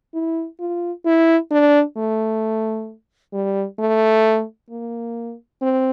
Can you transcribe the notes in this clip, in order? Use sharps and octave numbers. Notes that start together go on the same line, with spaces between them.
E4
F4
E4
D4
A3
G3
A3
A#3
C4